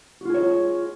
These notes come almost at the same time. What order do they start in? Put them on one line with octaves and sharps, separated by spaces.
F#4 F4 G#4 C#5